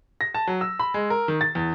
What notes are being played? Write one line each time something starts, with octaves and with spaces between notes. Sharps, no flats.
A#6
A5
F#3
E6
B5
G#3
A#4
D#3
A6
E2